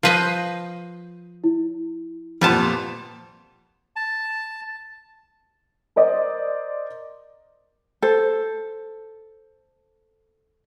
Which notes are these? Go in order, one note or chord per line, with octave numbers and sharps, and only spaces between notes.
F3 B4 D#5 G6 C7
E4
F2 A#2 G3 B3 A5
A5
A#4 C5 D5 D#5
A4 C5